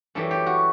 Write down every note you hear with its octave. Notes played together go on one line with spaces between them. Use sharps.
F#2 E3 G3 A4
G4
F#4